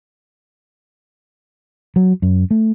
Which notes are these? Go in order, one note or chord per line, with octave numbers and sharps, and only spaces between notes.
F#3
F#2
A3